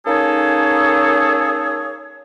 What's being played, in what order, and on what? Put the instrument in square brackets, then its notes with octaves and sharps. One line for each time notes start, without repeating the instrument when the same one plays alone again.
[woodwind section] A#3 C#4 D#4 G#4 A4 C#5